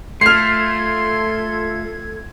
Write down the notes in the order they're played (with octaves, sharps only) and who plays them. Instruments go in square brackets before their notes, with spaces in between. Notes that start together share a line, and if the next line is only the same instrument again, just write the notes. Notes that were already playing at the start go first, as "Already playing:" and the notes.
[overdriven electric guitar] A3 [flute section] F4 A4 G#6 [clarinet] C6 [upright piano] F6 C7